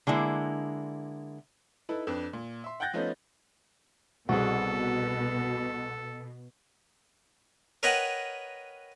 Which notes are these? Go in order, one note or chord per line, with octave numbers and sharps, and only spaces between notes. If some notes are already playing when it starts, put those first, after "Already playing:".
D3 G#3 A#3 E4
D#4 E4 A4 B4
F2 D4 B4
A#2
E5 C6
F#5 G5 F#6 G6 A6 A#6
F3 A3 B3 C#4 D#4
C2 B2 F#4 G#4 A4
A#4 B4 C#5 D#5 F#5 G5